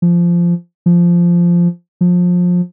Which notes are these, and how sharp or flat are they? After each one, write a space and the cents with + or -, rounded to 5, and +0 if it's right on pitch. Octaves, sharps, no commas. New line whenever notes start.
F3 -15
F3 -10
F3 +25